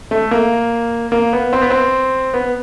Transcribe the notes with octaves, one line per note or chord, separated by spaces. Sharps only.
A3
A#3
A#3
B3
C4
B3
C4
B3